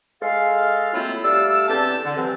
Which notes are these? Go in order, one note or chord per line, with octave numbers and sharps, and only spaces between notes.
G#3 A4 F5
F#3 A3 A#3 C4 E4 F4
G3 A3 D5 F5 E6
E2 D3 C4 G4 A5
D3
G2 C3 E3 F#3 C4